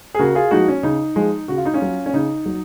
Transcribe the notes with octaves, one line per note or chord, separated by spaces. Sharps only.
G#4
C#3 F#4 A#4
F4 G#4
F3 G#3 D#4 F#4
C#4
C#3 D#4
F3 G#3
C#3 F#4
F4
D#4
C#4 F4
F#3
C#4
C#3 D#4
F#3